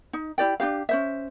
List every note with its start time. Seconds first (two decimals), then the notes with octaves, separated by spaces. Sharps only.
0.13 D#4
0.38 E4 G4 D5 G5
0.60 D4 F#4 G4 F5
0.89 C#4 C5 E5